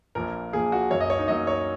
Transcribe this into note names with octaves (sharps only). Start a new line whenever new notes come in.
A#1 A#2 A#3 A#4
A#1 A#2 A#3 G#4
F#4
F#2 F#3 A#3 C#5
D#5
C#5
D#4
F#2 F#3 A#3 D#5
C#5